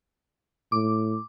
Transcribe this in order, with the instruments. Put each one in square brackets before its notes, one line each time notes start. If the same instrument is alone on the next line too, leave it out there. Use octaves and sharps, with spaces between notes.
[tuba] A2 [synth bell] D6